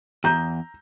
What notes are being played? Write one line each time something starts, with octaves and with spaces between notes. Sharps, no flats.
E2 A#5 G6